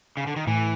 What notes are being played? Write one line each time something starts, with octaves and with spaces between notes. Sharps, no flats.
C#3
D3
D#3
A2 E3